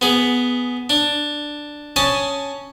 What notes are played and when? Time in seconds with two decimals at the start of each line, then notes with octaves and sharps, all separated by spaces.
0.01 B3 G#4
0.90 D4
1.96 C#4 G#5 A5 D#6